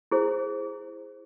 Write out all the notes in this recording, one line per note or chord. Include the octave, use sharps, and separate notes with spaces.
E4 G#4 C5